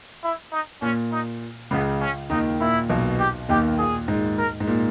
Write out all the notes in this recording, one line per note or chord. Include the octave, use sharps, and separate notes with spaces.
E4
D#4
A#2 C#4
D#4
C#2 C#3 B3
C#4
D#2 D#3 D#4
A#2 E4
B1 B2
G4
D#2 D#3 G4
A#2 G#4
G#2
A#4
G#2
A#2